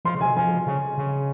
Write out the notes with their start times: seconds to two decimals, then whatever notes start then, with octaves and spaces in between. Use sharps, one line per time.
0.05 F3 C6
0.15 C#3
0.20 C3 G#5
0.37 F3 G#5
0.67 C#3
0.98 C#3